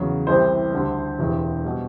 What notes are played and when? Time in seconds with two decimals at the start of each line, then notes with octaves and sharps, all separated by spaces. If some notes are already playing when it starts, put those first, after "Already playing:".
Already playing: E2 C#3 F#3
0.27 C2 C3 E3 G3 C5
0.72 D2 D3 G3
1.19 E1 E2 C3 E3
1.64 B2 G3